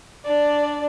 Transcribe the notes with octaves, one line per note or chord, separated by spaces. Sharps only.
D4 D5